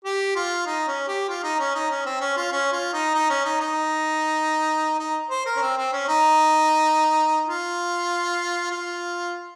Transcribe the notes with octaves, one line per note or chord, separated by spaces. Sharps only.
G4
F4
D#4
C#4
G4
F4
D#4
C#4
D#4
C#4
C4
C#4
F4
C#4
F4
D#4
D#4
C#4
D#4
D#4
D#4
C5
A#4
C#4
C4
C4
C#4
D#4
F4
F4